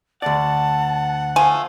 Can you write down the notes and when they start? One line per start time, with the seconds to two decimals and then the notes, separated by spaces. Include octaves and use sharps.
0.22 D2 D5 F#5 A5
1.36 F3 A3 F5 G#5